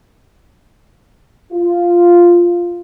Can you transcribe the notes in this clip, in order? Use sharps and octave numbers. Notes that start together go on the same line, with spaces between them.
F4